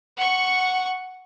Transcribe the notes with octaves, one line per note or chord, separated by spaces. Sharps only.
F#5 C#6